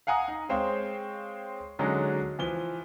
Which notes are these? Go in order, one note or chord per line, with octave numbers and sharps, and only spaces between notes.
F5 F#5 G#5 A#5 D#6
D#4
G#3 C4 C5 C#5 F5
D3 F#3 G#3 C#4 D#4
E3 F3 G7